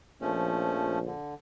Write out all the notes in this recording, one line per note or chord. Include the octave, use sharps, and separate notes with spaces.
A#1 F3 A3 C#4
D3